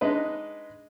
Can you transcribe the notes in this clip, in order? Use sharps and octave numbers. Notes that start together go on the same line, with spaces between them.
G#3 D4 D#4 B4